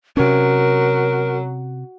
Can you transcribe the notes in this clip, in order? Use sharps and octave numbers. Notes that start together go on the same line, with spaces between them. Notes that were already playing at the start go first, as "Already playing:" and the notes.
C3 F#3 C#4 A#4